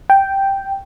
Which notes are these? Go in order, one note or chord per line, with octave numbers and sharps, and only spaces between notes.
G5